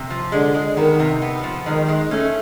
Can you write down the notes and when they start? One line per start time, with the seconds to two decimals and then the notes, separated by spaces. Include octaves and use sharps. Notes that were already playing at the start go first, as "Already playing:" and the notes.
Already playing: C3
0.10 F3
0.32 D3 G#3
0.54 G#3
0.77 D#3 B3
1.00 C3
1.22 B3
1.44 F3
1.66 D#3 G#3
1.88 G#3
2.11 A3 C#4